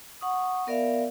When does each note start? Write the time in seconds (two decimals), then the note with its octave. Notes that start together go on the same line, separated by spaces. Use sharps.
0.21 F#5 C#6 D#6
0.67 B3 A#4 D5 E5 F5